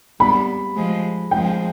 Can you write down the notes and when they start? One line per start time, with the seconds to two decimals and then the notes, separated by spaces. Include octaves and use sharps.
0.20 G3 B3 B5
0.76 F3 G#3
1.31 F3 G#3 G5